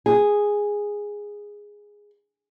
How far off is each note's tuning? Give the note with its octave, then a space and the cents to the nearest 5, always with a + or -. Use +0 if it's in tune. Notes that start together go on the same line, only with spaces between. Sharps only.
G#4 -5